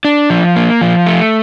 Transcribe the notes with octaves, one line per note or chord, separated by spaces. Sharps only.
D4
F3
A#3
F3
A3